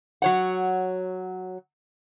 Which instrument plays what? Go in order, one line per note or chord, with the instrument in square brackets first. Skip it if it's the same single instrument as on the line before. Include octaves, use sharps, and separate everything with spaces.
[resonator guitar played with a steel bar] F#3 C#5 F#5